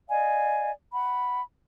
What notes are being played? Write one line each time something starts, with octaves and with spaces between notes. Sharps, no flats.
D5 D#5 F5 G#5
F#5 B5